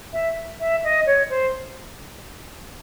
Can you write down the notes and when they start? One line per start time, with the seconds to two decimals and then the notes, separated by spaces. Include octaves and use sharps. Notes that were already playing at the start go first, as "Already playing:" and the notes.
0.13 E5
0.60 E5
0.84 D#5
1.06 C#5
1.30 C5